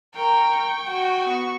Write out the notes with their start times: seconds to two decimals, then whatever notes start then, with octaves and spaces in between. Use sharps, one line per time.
0.16 A#4 G5 C#6
0.89 F#4
1.26 B3 C#6